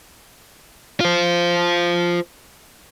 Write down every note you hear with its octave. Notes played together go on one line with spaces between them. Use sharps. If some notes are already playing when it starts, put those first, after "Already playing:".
F4 C5